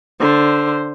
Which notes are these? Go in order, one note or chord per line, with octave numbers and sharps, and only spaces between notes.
D3 C5